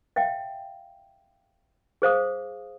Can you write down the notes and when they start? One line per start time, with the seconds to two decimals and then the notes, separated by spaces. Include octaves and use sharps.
0.16 E5 F5 G5
2.02 G#4 C5 F5 D#6